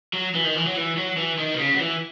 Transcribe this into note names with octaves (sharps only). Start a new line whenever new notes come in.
F#3
E3
D#3
E3
F#3
E3
F#3
E3
D#3
B2
C#3
F#3
E3